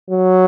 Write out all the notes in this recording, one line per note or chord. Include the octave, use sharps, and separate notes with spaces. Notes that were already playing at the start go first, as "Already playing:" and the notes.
F#3